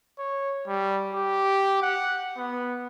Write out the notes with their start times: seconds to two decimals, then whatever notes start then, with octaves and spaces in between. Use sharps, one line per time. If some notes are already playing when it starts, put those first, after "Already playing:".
0.18 C#5
0.67 G3
1.14 G4
1.82 F#5
2.37 B3